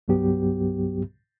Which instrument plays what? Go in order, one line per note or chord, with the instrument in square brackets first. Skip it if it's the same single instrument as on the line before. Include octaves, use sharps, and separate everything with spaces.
[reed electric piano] C2 G2 F#3 B3 G4